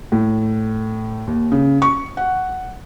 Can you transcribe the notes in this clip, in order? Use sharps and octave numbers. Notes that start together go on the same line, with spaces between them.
A2
D#2
C#3
C#6
F#5